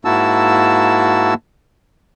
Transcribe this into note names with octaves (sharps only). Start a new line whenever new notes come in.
G#2 A#3 E4 F#4 A5 E6